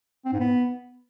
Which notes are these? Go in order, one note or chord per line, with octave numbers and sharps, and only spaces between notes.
C4
G#2
B3